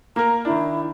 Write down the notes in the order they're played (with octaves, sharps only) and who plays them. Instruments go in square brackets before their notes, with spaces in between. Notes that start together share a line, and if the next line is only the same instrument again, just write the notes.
[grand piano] A#3 A#4 [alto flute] A#5
[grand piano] D#3 D4 [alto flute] E4